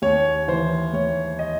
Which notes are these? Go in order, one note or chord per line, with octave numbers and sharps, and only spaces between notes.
D#2 C#5
E3 C5
D#2 C#5
D#5